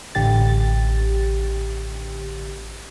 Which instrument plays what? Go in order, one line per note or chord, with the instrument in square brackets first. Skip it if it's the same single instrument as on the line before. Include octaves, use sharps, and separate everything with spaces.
[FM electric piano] A1 D3 G4 A6